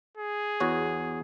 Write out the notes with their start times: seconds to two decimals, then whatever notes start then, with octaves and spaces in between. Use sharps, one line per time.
0.17 G#4
0.60 E2 F#4 C#5